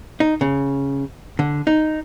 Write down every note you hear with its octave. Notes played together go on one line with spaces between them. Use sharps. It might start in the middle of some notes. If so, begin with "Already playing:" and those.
D#4
C#3
D3
D#4